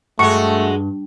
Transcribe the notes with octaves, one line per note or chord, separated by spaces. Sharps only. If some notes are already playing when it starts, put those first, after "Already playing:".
G2 G#3 A3 F#4 C#6